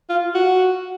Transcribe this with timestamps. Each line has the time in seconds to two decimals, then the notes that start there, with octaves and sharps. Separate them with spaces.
0.09 F4
0.34 F#4